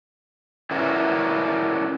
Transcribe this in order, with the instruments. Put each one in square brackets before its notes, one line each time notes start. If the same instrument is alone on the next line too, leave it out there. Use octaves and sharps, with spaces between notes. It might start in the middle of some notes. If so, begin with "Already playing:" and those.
[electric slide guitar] C#4 D4 E4 F#4 A#4 B4